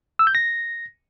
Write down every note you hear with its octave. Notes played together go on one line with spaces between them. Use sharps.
E6
G6
A#6